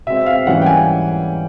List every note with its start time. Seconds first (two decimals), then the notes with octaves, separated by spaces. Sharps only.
0.07 B2 G#3 C4 E5
0.26 F5
0.47 G#2 E3 G3 A#3 C#4 F#5
0.62 G5
0.66 G#5